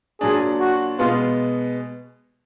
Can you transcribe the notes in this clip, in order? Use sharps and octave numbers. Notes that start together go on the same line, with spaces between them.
A#2 F#3 D4 G#4
F#4
B2 G#3 B3 F4